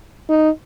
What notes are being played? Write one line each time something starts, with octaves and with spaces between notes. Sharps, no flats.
D#4